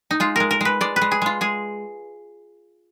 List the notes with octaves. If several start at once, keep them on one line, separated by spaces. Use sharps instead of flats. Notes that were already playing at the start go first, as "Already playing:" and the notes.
D#4
G#3 F4
G#3 A#4
A#4
G#3 B4
G#3 D5
B4
G#3
G#4
G#3 F4
G#3 G#4